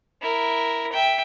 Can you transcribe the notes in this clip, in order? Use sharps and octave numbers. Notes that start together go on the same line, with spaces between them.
E4 A#4
E5 G5